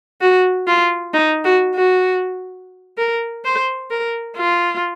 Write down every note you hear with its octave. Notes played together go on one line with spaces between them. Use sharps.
F#4
F4
D#4
F#4
F#4
A#4
C5
A#4
F4